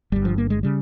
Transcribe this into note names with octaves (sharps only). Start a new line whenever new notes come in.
G1 G2 G3
F3
A#3
G#3
C#3 G3